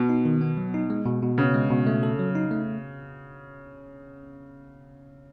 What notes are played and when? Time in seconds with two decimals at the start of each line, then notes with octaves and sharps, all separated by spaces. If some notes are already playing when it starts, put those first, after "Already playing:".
Already playing: B2
0.09 D#4
0.26 D#3
0.41 B3
0.57 F#3
0.74 D#4
0.90 G#3
1.06 B2
1.22 B2
1.38 C#3 B3
1.54 G#3
1.71 B2
1.87 A3
2.03 A4
2.19 F#3
2.35 D#4
2.51 A3